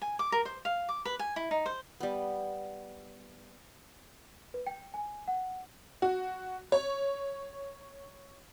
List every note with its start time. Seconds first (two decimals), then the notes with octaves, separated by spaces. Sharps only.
0.02 G#5
0.19 D6
0.32 A#4
0.45 C5
0.65 F5
0.89 D6
1.05 B4
1.19 G#5
1.36 E4
1.51 D#4
1.66 C5
2.00 G3 B3
4.54 B4
4.67 G5
4.94 G#5
5.28 F#5
6.02 F#4
6.72 C#5